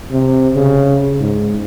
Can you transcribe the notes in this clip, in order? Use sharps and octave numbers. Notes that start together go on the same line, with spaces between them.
C3
C#3
G#2